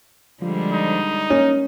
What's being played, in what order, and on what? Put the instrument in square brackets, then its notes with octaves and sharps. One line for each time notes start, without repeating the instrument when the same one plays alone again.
[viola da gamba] D3 G3 G#3 [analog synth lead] F3
[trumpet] D#4
[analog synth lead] A#3 [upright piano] C#4